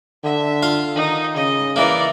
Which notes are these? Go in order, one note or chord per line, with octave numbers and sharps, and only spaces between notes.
D3 E5
F4 F5
D#3 D#4
C#3 D#5
E3 A#3 A#4 D5